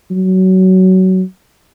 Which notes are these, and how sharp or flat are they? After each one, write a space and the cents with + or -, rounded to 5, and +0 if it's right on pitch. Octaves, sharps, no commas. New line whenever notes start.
F#3 +20